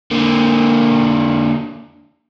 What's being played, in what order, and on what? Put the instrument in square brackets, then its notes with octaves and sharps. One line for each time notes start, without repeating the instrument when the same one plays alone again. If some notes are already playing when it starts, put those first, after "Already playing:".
[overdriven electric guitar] D3 A#3